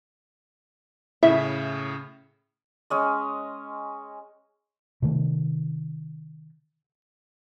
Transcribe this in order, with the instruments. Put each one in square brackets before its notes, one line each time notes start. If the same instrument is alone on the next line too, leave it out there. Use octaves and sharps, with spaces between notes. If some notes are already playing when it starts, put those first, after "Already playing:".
[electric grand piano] A2 C#3 [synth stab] E4 [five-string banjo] E5
[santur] G#3 C#4 D#5
[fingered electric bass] C3 D#3 A3